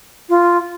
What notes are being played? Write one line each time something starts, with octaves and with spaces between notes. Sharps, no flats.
F4